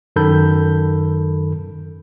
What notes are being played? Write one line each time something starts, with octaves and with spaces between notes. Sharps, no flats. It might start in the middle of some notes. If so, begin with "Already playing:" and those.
F#2 D#3 A4 B5 G6